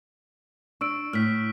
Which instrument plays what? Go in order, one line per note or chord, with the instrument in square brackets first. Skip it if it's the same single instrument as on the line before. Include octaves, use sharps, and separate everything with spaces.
[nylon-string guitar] D4 [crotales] C#6 E6 D7
[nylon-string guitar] A2 [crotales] F6 B6